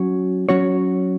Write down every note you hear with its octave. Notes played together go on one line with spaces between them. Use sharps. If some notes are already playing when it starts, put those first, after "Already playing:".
Already playing: F#3 C#4 F#4 C#5
F#3 C#4 F#4 C#5